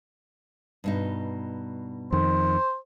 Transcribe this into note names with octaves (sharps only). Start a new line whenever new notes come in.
G2 B2 D#4
F2 D#3 C5